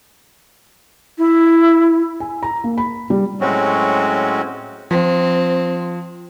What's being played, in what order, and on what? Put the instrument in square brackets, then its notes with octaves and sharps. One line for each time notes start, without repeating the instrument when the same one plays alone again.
[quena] E4
[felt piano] G#5
A#5
A#3
B5
G3
[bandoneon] A2 F#3 G#3 C4 C#4 F#4
[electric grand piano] F3 [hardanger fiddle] C4